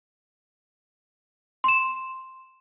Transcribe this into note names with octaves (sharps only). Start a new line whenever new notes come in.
C6 E7